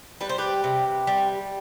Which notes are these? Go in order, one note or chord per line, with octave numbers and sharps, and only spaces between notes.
G3 B4
C5
G4 B4
C3
G3